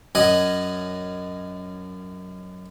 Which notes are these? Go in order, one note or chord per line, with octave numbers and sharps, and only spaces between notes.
F#2 D#5 F#5 G#5